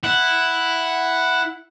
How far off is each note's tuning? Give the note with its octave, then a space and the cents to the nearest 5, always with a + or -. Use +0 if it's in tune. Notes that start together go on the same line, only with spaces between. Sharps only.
E4 +0 F#5 +0